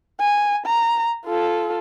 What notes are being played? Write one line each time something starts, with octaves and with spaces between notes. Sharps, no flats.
G#5
A#5
F4 A4